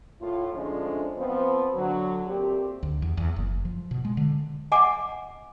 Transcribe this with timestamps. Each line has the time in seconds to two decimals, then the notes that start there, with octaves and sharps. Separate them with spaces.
0.21 A2 F4
0.53 D3 F3 G#3 A3 C#4 D4
1.17 F3 B3 C4
1.74 D3 F#3
2.27 A#2 A3 C4 G4
2.83 D2
3.02 E2
3.17 E2
3.36 F#1
3.65 F3
3.91 B2
4.05 G#3
4.17 D3
4.72 D#5 F#5 G#5 A#5 D6